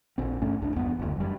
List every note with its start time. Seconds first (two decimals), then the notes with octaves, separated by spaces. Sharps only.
0.18 A#1 C4
0.42 G2 A3 C#4
0.62 C2 D4
0.76 E2 G2 B3
0.99 F#1 D2
1.16 F#2 G3